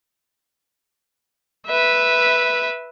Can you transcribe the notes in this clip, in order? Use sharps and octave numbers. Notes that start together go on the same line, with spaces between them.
B4 E5